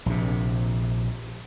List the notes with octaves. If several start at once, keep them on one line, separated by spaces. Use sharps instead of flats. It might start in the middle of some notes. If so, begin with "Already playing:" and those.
A#1 C3